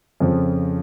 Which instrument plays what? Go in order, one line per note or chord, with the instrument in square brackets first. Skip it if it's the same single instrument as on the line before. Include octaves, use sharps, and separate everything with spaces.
[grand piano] F2 C#3 F3